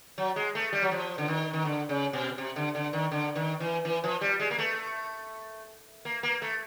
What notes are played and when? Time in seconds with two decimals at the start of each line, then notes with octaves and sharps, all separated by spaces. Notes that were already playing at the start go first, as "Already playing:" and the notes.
0.18 F#3
0.36 G#3
0.55 A3
0.73 G3
0.82 F#3
0.91 F3
1.18 D3
1.28 D#3
1.53 D#3
1.65 D3
1.89 C#3
2.13 B2
2.38 C3
2.56 D3
2.75 D3
2.93 D#3
3.12 D3
3.36 D#3
3.60 E3
3.85 E3
4.04 F3
4.21 G3
4.40 G#3
4.51 A#3
4.58 A3
6.05 A#3
6.23 A#3
6.42 A3